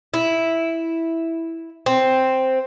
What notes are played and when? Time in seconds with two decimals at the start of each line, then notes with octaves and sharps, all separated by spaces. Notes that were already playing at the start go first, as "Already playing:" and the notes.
0.14 E4
1.86 C4